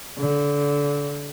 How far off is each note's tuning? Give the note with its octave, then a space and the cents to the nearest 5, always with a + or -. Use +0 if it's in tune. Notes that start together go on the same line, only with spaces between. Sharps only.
D3 -25